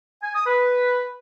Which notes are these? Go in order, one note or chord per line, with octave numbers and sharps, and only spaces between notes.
G#5
D#6
B4